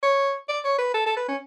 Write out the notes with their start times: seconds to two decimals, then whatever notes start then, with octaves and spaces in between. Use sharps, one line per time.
0.03 C#5
0.48 D5
0.64 C#5
0.79 B4
0.94 A4
1.06 A4
1.17 B4
1.28 C#4